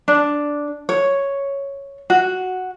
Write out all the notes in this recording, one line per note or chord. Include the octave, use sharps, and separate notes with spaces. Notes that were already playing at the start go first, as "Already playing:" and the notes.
D4
C#5
F#4